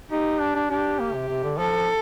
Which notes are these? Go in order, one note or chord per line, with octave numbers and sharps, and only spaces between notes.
D#4 G4
D4
D4
D4 G4
A#3
C3
C3
D3
F3 A4